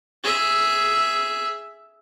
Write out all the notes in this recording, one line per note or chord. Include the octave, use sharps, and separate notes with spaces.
G#4 E5